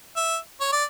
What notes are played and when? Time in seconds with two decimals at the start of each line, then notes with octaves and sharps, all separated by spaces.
0.16 E5
0.60 C#5
0.72 D5